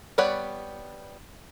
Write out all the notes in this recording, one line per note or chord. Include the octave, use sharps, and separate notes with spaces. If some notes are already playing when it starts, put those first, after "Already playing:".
G3 B3 C#5 D5 F#5